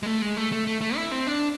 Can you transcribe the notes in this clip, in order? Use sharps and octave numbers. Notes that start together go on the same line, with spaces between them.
G#3
A3
G#3
A3
A3
A3
A3
E4
C4
D4